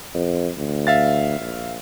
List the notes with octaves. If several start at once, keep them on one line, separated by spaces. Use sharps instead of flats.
F2
D2
E5 F5 A6
A#1